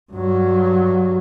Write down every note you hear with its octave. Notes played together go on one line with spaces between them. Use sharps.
G2 F#3